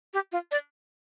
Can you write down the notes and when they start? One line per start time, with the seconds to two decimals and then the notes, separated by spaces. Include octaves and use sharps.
0.14 G4
0.32 F4
0.51 D5